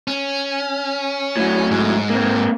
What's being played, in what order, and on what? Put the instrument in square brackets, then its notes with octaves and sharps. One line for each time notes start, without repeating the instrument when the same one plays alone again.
[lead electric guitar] C#4
[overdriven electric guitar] A2 F#3
[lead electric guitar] G#2
[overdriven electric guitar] A#3 C4